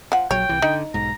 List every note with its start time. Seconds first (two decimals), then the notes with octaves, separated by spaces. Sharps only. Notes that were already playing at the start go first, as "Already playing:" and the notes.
0.12 F3 F#5
0.31 A#1 F#3 C#5 G5
0.49 C2 E3
0.62 D3 D#4
0.94 B1 G#2 A#5